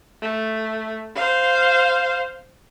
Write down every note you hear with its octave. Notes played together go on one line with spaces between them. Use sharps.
A3
C5 F5